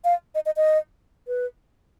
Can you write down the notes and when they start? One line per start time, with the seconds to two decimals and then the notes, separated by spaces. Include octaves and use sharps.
0.04 F5
0.35 D#5
0.46 D#5
0.56 D#5
1.28 B4